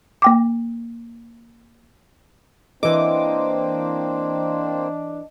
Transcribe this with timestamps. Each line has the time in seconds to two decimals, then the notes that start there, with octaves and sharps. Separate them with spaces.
0.22 A#3 G5 D6
2.83 E3 A#3 C4 D4 C5 D#5 D6